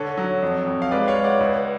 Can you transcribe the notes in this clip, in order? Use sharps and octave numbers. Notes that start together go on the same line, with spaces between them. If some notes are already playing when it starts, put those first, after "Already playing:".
Already playing: D3 A4 C#5
F#3
F2
F2
F5
G#3 B4 D5
C#5 F5
G#3
D5 F#5
C#2